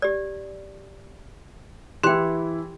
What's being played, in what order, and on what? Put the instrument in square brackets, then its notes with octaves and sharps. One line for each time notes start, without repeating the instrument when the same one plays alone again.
[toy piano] G4 D5
[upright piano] E3 E4 [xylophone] G4 F#6 [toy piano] G5 C6